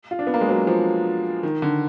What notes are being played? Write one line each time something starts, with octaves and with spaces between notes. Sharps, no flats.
F4
D4
B3
A#3
G#3
F#3
F3
D#3
D3